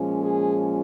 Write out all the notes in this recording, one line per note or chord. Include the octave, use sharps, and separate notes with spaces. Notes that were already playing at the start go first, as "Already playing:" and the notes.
Already playing: A#2 F3 G#3 C#4
G#4